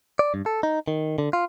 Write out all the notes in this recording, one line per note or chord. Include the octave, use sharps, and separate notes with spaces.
D5
G2
A4
D#4
D#3
D3
F4